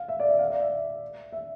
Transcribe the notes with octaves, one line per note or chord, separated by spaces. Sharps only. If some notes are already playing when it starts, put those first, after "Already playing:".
Already playing: F5
E5
D5
E5
F5
D5
E5
E5